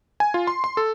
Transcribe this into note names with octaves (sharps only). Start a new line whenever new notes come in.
G#5
F4
C6
C6
A4